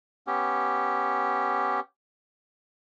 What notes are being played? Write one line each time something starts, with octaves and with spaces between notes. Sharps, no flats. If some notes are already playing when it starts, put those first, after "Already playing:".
B3 C#4 G4